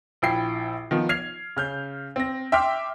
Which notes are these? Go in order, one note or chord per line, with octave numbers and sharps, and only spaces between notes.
A#1 E4 G5 C7
D#3 F3 B3
F6 G#6 C7 F7
C#3 F6 G6
C4 A#6
E5 G5 C6 D6 F6 B6